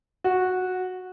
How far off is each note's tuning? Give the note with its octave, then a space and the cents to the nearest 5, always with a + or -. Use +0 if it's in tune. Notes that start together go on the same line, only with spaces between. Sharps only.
F#4 -10